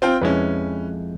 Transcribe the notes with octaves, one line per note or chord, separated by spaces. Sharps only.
C4 F4 G5
F2 G#3 C#4 E4 B4